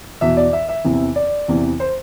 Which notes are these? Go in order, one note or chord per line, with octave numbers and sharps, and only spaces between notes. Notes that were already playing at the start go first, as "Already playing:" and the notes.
E2 B2 E5
D5
E5
E5
E2 C3 E3
D5
E2 C3 E3
C5